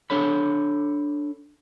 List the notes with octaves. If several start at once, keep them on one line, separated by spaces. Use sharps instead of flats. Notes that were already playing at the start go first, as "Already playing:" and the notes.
D4 A4 C#5 B5